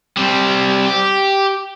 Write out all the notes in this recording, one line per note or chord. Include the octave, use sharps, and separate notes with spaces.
G3 C4
G4